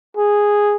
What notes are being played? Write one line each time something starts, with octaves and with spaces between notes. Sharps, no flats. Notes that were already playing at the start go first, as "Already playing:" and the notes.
G#4